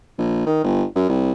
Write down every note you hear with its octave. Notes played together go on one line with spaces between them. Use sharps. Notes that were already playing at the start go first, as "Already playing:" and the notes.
A#1
D#3
G1
F#2
C2